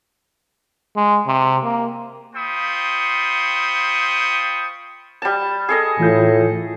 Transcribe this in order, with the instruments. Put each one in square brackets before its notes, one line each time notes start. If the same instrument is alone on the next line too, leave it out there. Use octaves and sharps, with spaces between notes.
[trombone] G#3
C3
A#3
[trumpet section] F4 C5 G5 B5 C#6 D#6
[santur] G3 A5
G#4 A4 D#5
[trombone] A2 [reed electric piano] E3 F4 G6